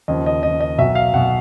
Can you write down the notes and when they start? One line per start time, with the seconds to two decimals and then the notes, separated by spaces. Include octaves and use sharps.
0.08 D#2 C#3 F3 D#5
0.26 D#5
0.43 D#2 C#3 F3 D#5
0.61 D#5
0.78 B1 B2 F#3 E5
0.95 F5
1.13 B1 B2 F#3 F#5